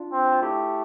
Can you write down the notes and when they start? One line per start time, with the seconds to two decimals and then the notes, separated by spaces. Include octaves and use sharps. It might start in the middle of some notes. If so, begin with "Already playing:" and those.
Already playing: D4 F4
0.13 C4
0.32 F4
0.42 A3 E4 G4